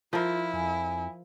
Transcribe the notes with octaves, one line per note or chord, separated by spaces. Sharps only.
F3 E4 F4 A#4
F2 G#5